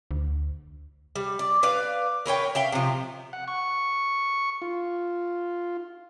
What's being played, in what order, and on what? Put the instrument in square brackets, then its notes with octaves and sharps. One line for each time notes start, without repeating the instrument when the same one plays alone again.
[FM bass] D2
[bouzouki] G3
D5
B4 D5 F5
A#4 B4 C#5 G5
E5 F5 G5
C3 F3
[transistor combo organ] F#5
C#6
F4